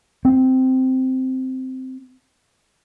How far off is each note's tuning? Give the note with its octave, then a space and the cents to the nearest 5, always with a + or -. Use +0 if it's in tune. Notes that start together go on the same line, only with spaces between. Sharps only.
C4 -10